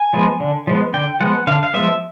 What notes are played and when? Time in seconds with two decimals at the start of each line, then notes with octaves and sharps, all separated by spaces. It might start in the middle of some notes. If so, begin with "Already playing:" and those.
Already playing: G#5
0.13 F3 G#3 B3
0.40 D3
0.67 F3 G#3 B3
0.94 D3 G5
1.20 F3 G#3 B3 F#5
1.47 D3 F5
1.63 F5
1.74 F3 G#3 B3 E5